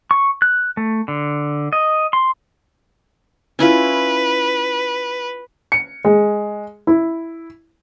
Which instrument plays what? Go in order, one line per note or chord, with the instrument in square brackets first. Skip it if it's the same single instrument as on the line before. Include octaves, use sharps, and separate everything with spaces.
[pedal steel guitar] C#6
F#6
A3
D3
D#5
C6
[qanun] C#4 E4 F4 [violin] B4
[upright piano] C#7
G#3
E4